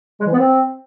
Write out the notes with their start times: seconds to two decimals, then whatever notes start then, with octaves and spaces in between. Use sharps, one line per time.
0.20 G#3
0.26 E3
0.32 B3
0.38 C4